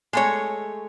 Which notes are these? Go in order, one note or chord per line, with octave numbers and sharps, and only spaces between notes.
G#3 A3 C#5